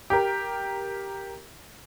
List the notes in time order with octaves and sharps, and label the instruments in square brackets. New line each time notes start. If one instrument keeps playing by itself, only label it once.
[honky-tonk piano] G4 A#4